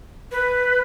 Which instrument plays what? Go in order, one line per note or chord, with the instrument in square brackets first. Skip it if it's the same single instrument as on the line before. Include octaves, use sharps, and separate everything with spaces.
[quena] B4